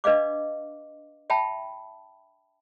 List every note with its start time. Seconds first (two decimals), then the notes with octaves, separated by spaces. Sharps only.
0.04 D4 B4 D#5 F5 D6
1.30 E5 G5 A5 B5